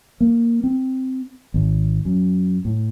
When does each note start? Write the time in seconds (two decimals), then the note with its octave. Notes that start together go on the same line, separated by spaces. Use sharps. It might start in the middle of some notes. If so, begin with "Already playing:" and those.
0.20 A#3
0.64 C4
1.54 G#1
2.05 F#2
2.65 A2